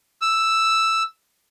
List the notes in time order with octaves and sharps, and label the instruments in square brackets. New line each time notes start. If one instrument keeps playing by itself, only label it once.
[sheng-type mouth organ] E6